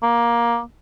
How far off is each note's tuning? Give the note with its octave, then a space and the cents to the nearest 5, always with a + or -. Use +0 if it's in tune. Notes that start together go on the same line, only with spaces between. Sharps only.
A#3 +15